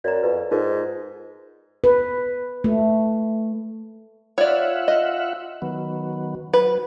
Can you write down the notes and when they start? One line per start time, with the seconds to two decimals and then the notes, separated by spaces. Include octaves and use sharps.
0.04 F#2 D5 A#5
0.23 F2 B4
0.51 G#2 D#4 F4 A#4
1.84 B4
2.64 A3
4.38 F4 C#5 D5 E5 F#5
4.88 D#5
5.62 D#3 F#3 B3
6.53 F#3 B4